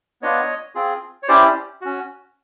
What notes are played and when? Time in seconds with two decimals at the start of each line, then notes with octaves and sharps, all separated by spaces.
0.22 B3 D4 F4 C#5 D#5
0.75 C4 F4 G#4
1.23 C#5
1.28 C#4 E4 G4 C5 D5
1.82 C#4 F#4